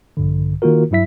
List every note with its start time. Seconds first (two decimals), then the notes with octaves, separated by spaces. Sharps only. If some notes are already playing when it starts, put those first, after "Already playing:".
0.17 A#1 G2 D3
0.62 D#3 A#3 F4 F#4 A#4
0.91 G2 F#3 E4 E5 B6